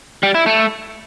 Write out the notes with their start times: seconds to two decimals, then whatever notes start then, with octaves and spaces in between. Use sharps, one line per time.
0.23 G3
0.34 E4
0.46 A3